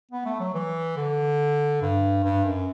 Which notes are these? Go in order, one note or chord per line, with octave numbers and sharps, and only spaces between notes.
B3
A3
F#3
E3
D3
G2
G2
F#2